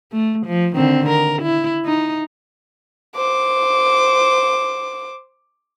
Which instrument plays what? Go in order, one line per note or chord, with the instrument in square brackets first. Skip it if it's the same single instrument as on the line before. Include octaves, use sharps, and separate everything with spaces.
[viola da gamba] A3
F3
D3 D#3 C4
A#4
E4
D#4
[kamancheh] C5 D6